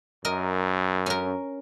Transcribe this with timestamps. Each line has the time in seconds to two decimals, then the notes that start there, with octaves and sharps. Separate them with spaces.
0.25 F#2 A#4 D#5
1.06 C#4 A#4